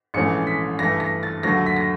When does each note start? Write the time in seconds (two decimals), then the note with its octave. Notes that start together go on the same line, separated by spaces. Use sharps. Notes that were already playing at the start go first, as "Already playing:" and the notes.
0.14 A#1 G#2 E3 A3 C#4 C#7
0.47 B6
0.79 G2 E3 A3 A#6
1.00 A#6
1.23 A6
1.43 D#2 D3 F#3 A3 A#6
1.66 B6
1.76 A#6